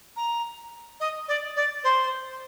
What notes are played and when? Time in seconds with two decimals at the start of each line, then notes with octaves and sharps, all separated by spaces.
0.16 A#5
1.00 D#5
1.28 D5
1.56 D5
1.83 C5